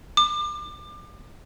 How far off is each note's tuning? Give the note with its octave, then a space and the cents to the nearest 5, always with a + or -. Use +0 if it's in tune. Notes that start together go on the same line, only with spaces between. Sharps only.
D6 +30